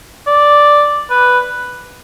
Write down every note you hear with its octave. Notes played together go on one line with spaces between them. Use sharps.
D5
B4